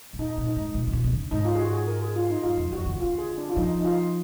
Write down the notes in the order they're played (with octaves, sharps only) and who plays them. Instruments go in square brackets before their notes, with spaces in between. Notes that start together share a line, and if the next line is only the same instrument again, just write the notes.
[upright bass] G#2
[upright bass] A#2 [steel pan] D#4
[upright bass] A#2
[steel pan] D#4
[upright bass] G#2
A#2
B2
A#2
B2
D3
[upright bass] G#2 [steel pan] D#4
[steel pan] F4
G#4
F#4
G#4
A#4
G#4
F4
D#4
[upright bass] F#2 [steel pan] F4
[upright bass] F2
[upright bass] F2 [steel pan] F#4
[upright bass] D3
D#3
[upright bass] D3 [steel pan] F4
[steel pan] G#4
D4
F4
[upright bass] F3 [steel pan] D#4
[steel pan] D#4
F4